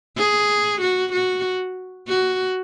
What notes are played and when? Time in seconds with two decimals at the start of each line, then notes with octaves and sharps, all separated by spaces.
0.17 G#4
0.81 F#4
1.12 F#4
2.08 F#4